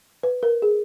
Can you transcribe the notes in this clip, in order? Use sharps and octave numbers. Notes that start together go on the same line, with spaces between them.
B4
A#4
G#4